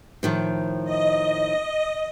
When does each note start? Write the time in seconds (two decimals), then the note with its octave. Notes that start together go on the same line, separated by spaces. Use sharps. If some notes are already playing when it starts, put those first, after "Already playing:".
0.23 A2 D#3 F3
0.84 D#5